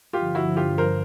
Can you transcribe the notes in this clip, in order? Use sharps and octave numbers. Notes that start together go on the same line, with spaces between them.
G2 D3 F3 F4 G4
E4 F#4
F4 G4
A#4 C5